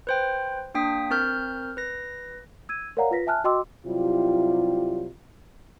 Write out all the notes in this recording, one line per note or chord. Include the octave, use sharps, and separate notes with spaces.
B4 C5 G5
A#3 D4 G5 D#6 B6
C4 A#4 F6 G6
B4 A#6
E6 G#6 D#7
A#4 C#5 D5 F5 F#5 A#5
F4 B4 A#6 B6
E5 G#5 A5 F6 F#6
F#4 D#5 G5 C6 D6 E6
C3 F#3 G3 E4 F4